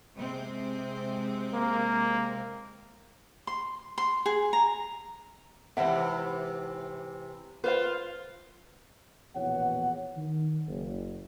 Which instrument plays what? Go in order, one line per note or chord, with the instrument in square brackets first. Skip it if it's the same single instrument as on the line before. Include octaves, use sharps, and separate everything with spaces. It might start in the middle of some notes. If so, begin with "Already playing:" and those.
[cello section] C3 G#3 C4
[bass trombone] A#3
[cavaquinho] C6
C6
G#4
A#5
[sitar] G#2 C3 E3 [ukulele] E5 F#5
[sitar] F4 [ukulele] B4 C5 F5
[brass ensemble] A#1 E2 B2 C#5 F#5
D#3
F#1